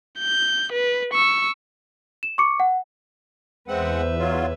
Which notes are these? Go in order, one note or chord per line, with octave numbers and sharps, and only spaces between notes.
G6
B4
C#6 E6
E7
C#6 D6 C#7
F#5
E2 G#3 C4 B4 C5 E5 F#5
F#3 F4 C#5